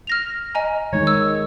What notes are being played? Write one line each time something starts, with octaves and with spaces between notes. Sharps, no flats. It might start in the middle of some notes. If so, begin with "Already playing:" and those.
F6 A#6 F7
D#5 G#5 A#5
D#3 G#3 D#4 C#5
E6